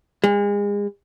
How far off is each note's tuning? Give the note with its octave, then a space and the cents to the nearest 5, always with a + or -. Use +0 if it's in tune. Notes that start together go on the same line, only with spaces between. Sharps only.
G#3 -35